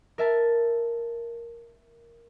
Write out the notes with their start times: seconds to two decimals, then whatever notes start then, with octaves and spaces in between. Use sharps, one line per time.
0.18 A#4 E5 A5